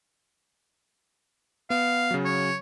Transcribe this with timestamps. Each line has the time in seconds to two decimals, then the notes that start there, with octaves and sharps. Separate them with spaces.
1.70 B3 F5
2.11 C#3 F#3
2.25 C#5